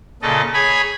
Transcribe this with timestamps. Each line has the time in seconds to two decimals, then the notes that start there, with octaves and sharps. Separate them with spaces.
0.22 A#2 C#3 A4 D#5
0.54 G#4 C#5 G#5 B5